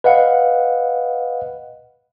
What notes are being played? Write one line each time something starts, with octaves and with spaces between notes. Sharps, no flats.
B4 D#5 F5 F#5